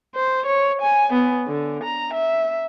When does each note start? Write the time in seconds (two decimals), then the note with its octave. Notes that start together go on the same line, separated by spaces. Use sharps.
0.15 C5
0.46 C#5
0.82 G#5
1.13 B3
1.48 D3
1.84 A#5
2.14 E5